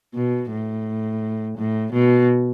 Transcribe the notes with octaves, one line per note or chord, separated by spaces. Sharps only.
B2
A2
A2
B2